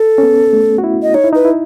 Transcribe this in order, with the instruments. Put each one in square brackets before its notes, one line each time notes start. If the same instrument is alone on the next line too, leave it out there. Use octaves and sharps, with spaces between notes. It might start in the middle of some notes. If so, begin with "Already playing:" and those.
Already playing: [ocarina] A4
[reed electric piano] C#4
B3
A3
F#4
E4
[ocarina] D#5
[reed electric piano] D#4 [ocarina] C#5
[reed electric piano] E4
[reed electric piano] D#4 [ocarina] B4
[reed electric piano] E4